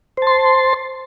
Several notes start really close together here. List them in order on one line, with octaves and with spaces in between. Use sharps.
C5 A5 C6